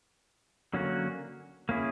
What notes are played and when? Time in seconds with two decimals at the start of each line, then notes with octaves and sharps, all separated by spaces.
0.74 D3 F#3 A#3 C#4 F#4
1.69 A#3 C#4 E4 G#4